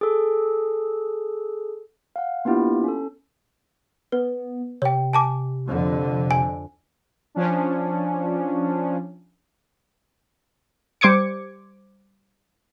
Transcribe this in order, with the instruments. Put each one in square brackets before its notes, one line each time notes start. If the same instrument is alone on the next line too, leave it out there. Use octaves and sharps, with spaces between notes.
[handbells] G#4 A4
F5 F#5
A#3 B3 D4 E4 F4 G4
C#4 A4
[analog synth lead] B3 [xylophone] B4
[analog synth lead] C3 [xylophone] C#5 G5
[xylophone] G#5 A5 D6
[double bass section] F2 D3
[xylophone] G#5
[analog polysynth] F3 C#4 D4
[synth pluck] G3 C5 D6 G#6 C#7